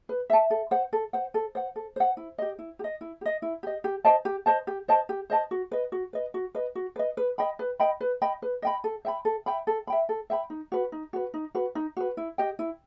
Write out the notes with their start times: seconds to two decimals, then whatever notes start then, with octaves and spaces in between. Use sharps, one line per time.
0.09 B4
0.30 E5 A5
0.50 A4
0.71 C5 F#5
0.93 A4
1.13 C5 F#5
1.34 A4
1.55 C5 F#5
1.76 A4
1.96 C5 F#5
2.17 E4
2.38 G4 D#5
2.59 E4
2.79 G4
2.84 D#5
3.01 E4
3.21 G4
3.26 D#5
3.42 E4
3.63 G4 D#5
3.84 G4
4.05 C5 D#5 A5
4.25 G4
4.46 C5 D#5 A5
4.67 G4
4.88 C5 D#5 A5
5.09 G4
5.30 C5 D#5 A5
5.51 F#4
5.71 B4 D#5
5.92 F#4
6.13 B4 D#5
6.34 F#4
6.55 B4 D#5
6.75 F#4
6.96 B4 D#5
7.17 B4
7.38 D#5 G5 B5
7.59 B4
7.80 D#5 G5 B5
8.01 B4
8.22 D#5 G5 B5
8.42 B4
8.62 D#5 G5 B5
8.84 A4
9.05 E5 G5 B5
9.25 A4
9.46 E5 G5 B5
9.67 A4
9.87 E5 G5 B5
10.09 A4
10.30 E5 G5 B5
10.50 D#4
10.72 F#4 B4
10.92 D#4
11.13 F#4 B4
11.34 D#4
11.55 F#4 B4
11.75 D#4
11.97 F#4 B4
12.17 E4
12.38 G4 D#5 G5
12.59 E4